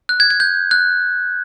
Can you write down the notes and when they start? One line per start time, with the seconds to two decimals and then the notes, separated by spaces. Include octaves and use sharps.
0.09 F#6
0.20 G#6
0.30 G#6
0.40 G6
0.71 F#6